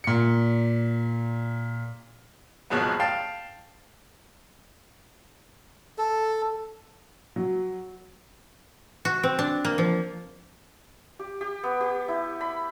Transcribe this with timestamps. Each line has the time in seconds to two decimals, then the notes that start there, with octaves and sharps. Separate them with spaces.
0.04 A#2 C#7
2.70 C2 B2 F3 F#3 G#3 B3
3.00 F5 G5 A5
5.98 A4
7.36 F#3
9.05 F#4
9.23 C4
9.39 D4
9.65 A#3
9.78 F3
11.19 G4
11.41 G4
11.63 B3
11.81 G4
12.08 E4
12.41 B5